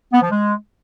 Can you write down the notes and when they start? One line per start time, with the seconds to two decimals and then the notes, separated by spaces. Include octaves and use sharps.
0.12 B3
0.22 F3
0.31 G#3